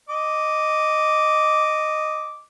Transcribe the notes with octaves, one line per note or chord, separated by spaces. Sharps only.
D#5 D6